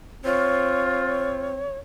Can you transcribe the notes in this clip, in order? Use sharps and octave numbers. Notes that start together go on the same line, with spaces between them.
C4 F4 C#5